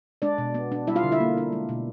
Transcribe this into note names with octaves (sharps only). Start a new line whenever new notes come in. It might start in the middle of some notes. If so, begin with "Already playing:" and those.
G#3 D4 D5
B2
B3
D4
G3 E4 E5
F4 F5
D3
E4 E5
A#3
D4
G#3
B2